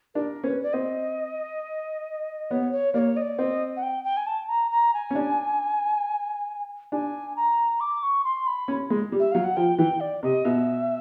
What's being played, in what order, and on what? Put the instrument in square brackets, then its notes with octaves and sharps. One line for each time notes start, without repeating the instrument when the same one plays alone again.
[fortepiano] D4 [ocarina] A#4
[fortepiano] C#4 [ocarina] C5
[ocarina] B4
D5
[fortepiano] C4 [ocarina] D#5
[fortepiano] B3 [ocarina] C#5
[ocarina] C#5
[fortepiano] A#3 [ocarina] D5
[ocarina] C#5
D#5
D5
[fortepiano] C4 [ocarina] D#5
[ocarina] F#5
G5
G5
G#5
A5
A#5
A#5
G#5
[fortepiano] C#4
D4
[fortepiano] D4 [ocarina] G#5
[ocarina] A#5
D6
C#6
C6
B5
[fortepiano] C#4
G#3
G3
[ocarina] E5
[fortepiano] F#3 [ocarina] F5
[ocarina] F#5
[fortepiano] F3 [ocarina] G5
[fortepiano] E3 [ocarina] G5
[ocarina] D5
[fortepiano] C3 [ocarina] D#5
[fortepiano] B2 [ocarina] E5